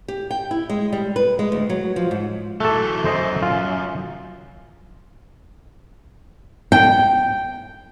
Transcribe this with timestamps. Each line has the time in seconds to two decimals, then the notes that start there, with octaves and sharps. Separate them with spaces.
0.08 G4
0.31 G5
0.51 E4
0.70 G#3
0.93 G3
1.16 B4
1.39 G#3
1.52 D2
1.70 F#3
1.96 F3
2.11 G#2
2.60 E3 F#3 A3 A4
3.05 F#2 C5 D#5
3.43 F4
6.72 G5